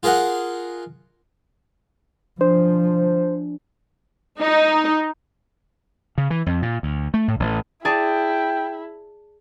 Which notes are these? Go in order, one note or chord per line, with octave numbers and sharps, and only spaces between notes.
F4 G#4 A#4 D#5 F#5
F3 D4 C5
D#4
C#3
E3
F2
A#2
D2
A3
A2
A1
E4 G#4 D5 G5 A5